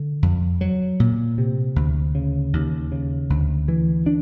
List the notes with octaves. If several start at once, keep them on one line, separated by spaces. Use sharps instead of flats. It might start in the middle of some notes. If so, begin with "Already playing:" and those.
Already playing: D3
F2
F#3
A#2
C3
D2
C#3
D#2
C#3
D2
E3
D4